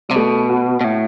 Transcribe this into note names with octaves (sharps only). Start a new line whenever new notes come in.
C3 G3
B2 A3
F#4
B2
A2